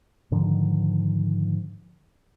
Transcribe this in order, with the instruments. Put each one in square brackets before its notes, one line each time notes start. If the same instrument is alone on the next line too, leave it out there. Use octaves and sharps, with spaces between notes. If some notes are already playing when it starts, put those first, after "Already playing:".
[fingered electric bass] G#2 D3 D#3 F3